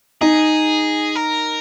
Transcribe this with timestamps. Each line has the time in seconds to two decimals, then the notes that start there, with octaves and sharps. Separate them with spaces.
0.21 D#4 G#4
1.15 A#4